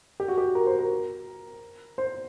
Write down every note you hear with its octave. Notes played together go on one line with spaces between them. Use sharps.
G4
F#4
G4
A#4
C5
A#4
C5